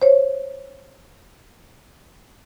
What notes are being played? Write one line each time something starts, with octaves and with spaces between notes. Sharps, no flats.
C5 C#5